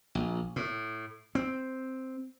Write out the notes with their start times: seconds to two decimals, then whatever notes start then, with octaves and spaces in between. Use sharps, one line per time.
0.15 A#1
0.56 A2
1.35 C4